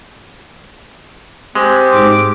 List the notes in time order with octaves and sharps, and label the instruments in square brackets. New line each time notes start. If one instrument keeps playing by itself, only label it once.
[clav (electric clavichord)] G#3 [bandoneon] C4 G4
[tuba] G#2 [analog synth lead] D6